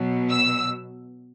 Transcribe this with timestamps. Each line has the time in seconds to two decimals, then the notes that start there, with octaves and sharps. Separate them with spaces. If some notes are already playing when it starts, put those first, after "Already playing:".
Already playing: B2 F#3
0.29 E6